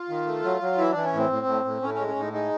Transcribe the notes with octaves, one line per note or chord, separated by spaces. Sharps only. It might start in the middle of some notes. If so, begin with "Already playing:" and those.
Already playing: F4
D#3
A3
F#3
F#3
E3 E4
E3 D4
C#4
A2 C4
A2
A2
A2
A2 C#4
C#4
G#3
C#4
A2 D#4
G#3 D#4